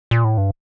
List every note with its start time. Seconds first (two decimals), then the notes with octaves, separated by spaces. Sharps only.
0.11 A#2
0.24 A2
0.38 G2